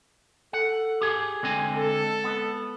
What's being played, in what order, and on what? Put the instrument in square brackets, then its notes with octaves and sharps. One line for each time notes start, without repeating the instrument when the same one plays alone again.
[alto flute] A4 [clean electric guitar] F#5
[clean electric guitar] G4 G#4
[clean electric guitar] D3 C4 G#5 [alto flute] G#3
[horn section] A4
[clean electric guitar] B3